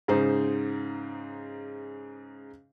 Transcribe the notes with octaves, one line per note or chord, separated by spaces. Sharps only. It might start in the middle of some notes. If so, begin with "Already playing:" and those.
G#2 C#3 D#4 C5